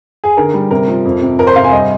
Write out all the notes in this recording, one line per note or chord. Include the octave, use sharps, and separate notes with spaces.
G#4
D3 A#4
G3
C3 A#4
F3
F2
C3
F2 A#4
C5
C3 F5
G#5
G2 D#5